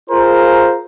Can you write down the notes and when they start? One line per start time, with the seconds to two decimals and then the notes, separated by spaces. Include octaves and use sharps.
0.10 F4 G#4 A#4 C5